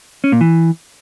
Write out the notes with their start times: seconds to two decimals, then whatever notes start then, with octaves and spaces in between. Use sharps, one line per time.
0.24 C#4
0.32 A#2
0.41 E3